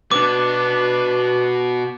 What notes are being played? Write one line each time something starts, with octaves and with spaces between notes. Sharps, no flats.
B2 B3 D4 B4 D6